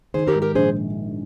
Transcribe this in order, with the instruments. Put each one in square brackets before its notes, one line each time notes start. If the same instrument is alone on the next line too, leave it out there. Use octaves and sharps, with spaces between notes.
[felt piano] D#3 [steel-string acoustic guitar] G#4 C5
[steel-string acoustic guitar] G4 A#4
[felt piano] G#2
[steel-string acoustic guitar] G4 A#4
[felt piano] A#1 [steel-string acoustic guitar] G#4 C5